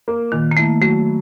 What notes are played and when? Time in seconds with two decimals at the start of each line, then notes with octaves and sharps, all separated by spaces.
0.08 A#3
0.32 A#2 D#3
0.51 A#3
0.57 A3 E4
0.81 F#3 A3